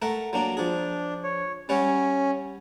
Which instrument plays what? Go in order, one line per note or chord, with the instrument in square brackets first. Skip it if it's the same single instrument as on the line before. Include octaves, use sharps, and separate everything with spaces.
[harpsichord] A3 A#4 F#5
F#3 A#3 D4
[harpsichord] F3 G#4 [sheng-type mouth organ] D4
[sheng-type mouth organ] C#5
[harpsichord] G3 C#5 F#5 [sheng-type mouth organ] C#4